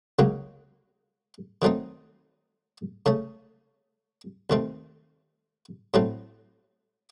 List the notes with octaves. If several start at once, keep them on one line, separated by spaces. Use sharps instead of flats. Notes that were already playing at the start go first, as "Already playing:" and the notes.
C#2 C#3 F#3 A#3
D#3 F#3 A3 C4 D#4
C#3 A3 C#4
D#2 D#3 A3 C4
A2 F#3 A3 C4